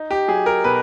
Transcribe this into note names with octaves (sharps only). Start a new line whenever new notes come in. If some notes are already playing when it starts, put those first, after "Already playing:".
Already playing: D#4
G4
F#3 G#4
A#4
B2 B4